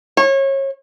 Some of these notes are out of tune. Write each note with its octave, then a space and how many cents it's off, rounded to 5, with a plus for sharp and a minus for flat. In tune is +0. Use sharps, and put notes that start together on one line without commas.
C#5 -30